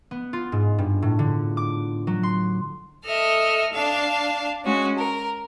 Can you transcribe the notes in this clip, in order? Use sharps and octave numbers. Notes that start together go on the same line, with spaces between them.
B3
F4
G#2
G2
A2
D3
D6
F#3
C6
A4 D#5 E5 F6
D4 F5 A5
G#3 C#4 F#4
A#4